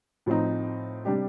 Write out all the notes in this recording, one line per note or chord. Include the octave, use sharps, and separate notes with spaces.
A2 F3 C4 D#4
C3 G3 D4 G4